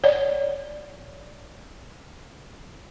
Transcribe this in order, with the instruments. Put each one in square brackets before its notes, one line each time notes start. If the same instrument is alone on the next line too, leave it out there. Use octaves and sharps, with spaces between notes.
[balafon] C#5 D5